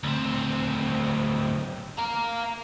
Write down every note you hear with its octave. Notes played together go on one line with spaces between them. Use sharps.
D2 C4
F5 A#5